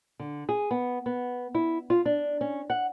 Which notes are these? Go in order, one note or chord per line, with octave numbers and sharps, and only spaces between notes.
D3
G#4
B3
B3
E4
F4
D4
C#4
F#5